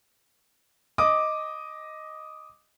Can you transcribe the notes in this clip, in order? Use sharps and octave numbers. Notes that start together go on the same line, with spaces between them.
D#5 D6 D#6